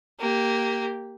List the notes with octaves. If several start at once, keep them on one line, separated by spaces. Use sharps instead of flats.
A#3 G4